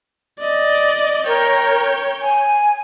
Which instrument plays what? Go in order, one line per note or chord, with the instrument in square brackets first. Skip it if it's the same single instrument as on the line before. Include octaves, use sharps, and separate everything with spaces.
[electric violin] D5 D#5
[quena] A#4 [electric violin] C#5 G5
[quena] G#5